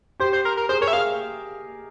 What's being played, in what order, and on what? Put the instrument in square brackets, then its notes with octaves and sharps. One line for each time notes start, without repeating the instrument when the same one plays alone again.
[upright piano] G4 [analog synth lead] C5
[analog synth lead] C5
A#4
A#4
[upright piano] G#4 [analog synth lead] C5
[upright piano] A#4 [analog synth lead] C#5
[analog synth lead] E5
[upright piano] G#4 [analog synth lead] F5